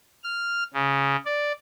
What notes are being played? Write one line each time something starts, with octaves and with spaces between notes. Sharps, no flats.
F6
C#3
D5